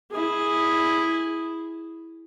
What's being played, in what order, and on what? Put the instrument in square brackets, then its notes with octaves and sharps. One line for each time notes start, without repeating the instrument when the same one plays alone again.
[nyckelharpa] E4 G#4